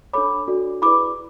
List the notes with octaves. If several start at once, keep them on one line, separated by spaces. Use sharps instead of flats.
D4 A4 C#5 B5 D6
D4 F#4 A4 D5
E4 G#4 B4 D5 B5 D6